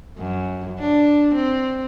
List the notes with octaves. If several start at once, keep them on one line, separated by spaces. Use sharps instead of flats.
F#2
D4
C4